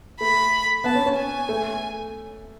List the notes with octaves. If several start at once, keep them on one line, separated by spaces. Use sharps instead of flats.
A3 B5
B3 A5
C#4
C#4
G#5
A3